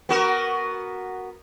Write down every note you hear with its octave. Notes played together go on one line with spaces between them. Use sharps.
B3 F#4 A#4